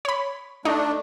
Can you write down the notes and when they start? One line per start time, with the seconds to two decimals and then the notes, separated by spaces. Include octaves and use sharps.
0.05 C#5 B5
0.65 A3 D4 D#4